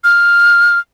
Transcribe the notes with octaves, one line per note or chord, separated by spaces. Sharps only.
F6